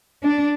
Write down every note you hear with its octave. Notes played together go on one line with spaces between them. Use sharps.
D4